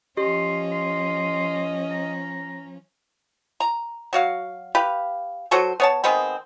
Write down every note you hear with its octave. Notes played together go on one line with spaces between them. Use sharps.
F3 C#4 G4 D#5 C6
C6
A#5
A#5
F#3 F#4 F5
G4 B4 F5
F#3 F#4 A4 C5
B3 C#5 A5
D#3 G#3 B3 C4